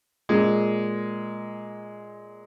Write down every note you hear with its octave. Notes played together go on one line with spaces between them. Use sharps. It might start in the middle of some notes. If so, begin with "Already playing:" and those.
A#2 G#3